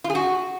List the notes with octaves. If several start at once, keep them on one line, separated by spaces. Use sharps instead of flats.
F4
G#4
F#4